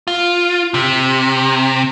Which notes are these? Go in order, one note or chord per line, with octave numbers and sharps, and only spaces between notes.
F4
C3